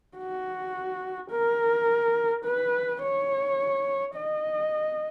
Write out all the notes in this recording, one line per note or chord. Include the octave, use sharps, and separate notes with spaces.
F#4
A#4
B4
C#5
D#5